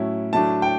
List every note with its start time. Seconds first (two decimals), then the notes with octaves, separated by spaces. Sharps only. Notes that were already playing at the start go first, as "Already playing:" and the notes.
Already playing: A2 F#3 C#4 E4
0.33 A2 F#3 A3 D4 A5
0.62 G5